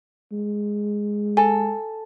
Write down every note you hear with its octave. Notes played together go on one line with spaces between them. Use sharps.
G#3
A4 G#5